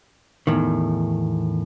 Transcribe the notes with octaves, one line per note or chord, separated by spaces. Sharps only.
E2 A2 D#3